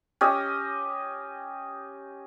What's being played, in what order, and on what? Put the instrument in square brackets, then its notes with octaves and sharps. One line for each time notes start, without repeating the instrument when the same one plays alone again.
[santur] C#4 G4 D#5